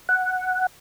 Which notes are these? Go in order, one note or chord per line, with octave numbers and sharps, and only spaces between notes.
F#5